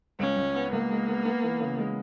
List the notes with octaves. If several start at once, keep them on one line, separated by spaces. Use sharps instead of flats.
C#2 C#4
C#2
B3
C#2 A#3
G#3
B3
B3
E3
C#3
G#3